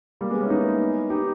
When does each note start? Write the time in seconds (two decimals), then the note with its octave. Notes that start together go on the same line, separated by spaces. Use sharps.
0.21 G3 A#3
0.30 G#3 B3
0.40 A#3 C#4
0.46 E4
0.50 B3 D#4
1.10 D#4 G4